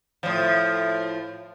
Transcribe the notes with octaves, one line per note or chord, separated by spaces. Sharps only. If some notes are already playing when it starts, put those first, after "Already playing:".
A2 F3